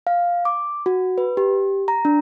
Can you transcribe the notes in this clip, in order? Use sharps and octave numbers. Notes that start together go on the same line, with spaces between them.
F5
D6
F#4
B4
G4
A#5
D4